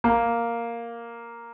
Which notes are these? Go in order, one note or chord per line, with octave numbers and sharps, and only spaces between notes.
A#3